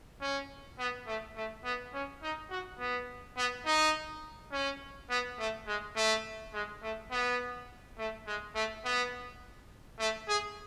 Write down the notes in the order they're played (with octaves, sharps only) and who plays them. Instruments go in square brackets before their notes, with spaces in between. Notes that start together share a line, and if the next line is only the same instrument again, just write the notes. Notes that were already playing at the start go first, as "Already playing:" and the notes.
[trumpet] C#4
B3
A3
A3
B3
C#4
D#4
F#4
B3
B3
D#4
C#4
B3
A3
G#3
A3
G#3
A3
B3
A3
G#3
A3
B3
A3
G#4